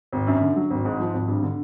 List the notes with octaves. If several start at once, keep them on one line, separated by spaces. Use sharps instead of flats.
G#1
F#2
D3
F#3
G#1
G#2
F3
G#1
G2
D3